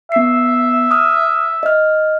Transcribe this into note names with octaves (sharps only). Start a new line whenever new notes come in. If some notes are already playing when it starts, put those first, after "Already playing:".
B3 E5 C7
D#6 F6
D#5 F6